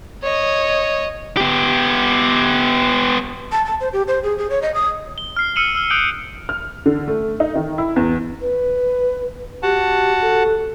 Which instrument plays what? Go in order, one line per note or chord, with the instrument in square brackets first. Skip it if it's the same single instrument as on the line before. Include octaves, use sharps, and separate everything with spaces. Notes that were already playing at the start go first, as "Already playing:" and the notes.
[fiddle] C#5 D#5
[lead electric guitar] B3 G4
[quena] A5
A5
C5
G4
C5
G#4
G#4
C#5
D#5
D#6
[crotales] G7
F6 C7
E6 F6 C#7 D#7 E7 F#7
E6 F6 G7
D#6 F#6 G6 D7 F#7 G7
[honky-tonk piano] F6
D3
A3
D#4
D#3
E4
E2
[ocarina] B4
[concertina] F#4 F#5 A5 [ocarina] G4
[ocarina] A4